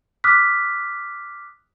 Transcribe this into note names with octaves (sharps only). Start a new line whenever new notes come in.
D6 D#6 F6 F#6 B6